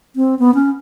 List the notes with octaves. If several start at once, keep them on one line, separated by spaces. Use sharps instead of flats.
C4
B3
C#4